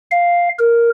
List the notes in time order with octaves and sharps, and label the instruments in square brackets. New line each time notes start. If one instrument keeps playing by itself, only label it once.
[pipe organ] F5
A#4